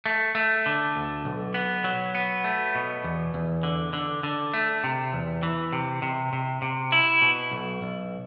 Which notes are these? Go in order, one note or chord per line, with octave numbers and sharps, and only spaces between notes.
A3
A3
D3
D2
B1
B3
F#3
B3
A3
B2
E2
E2
D3
D3
D3
A3
C3
E2
E3
C3
C3
C3
C3
E4
B2
B1
B1